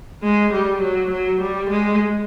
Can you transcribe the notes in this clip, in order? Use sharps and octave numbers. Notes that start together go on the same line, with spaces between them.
G#3
G3
F#3
F#3
G3
G#3